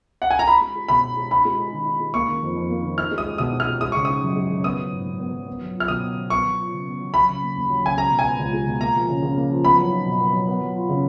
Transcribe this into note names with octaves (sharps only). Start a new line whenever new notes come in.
F#5
G#5
A#5
D#4 B5
G#3
G#4
B2 B5
D#4
G#3
D#4 B5
G#3
G#4
D#3
D#4
G#3
A#3 C#6
D#3
F2
F2
A#3
D#3
D#4 F6
G#3
D#6
G#4
B2 D#6
D#4
F6
G#3
G#3 D#6
C#3 C#6
D#4 D#6
F#2
G#3
C#3
B3 D#6
F#3
G#2
G#2
B3
F#3
B3
F#3
F4
F6
B2 D#6
B3
F#3
B3 C#6
F#3
F4
C#3
B3
F#3
F#3 B5
C#3
A#3
D#2
F#3
C#3 G#5
G#3 A#5
B2
G#5
B3
C#2
G#3
B2
A#3 A#5
F3
C#3
C#3
A#3
F3
B3 B5
F#3
D#4
B2
B3
F#3
B3
F#3
F4
C#3